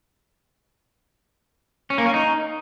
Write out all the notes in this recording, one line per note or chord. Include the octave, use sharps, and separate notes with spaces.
C#4
A#3
C#4
D#4